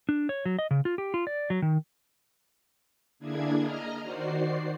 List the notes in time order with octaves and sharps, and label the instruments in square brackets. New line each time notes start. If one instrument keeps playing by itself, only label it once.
[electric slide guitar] D4
C#5
F#3
D#5
C#3
F4
G4
F4
D5
F#3
D#3
[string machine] D3 A#3 D4 E4 G#4 G#6
D#5 A#5 F6
D#3 F#4 C5 D5 C7